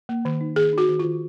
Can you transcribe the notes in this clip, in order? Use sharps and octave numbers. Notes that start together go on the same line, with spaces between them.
A#3
D#3
D#4
D#3 G#4
D#4 F#4
D#3
F4
D#3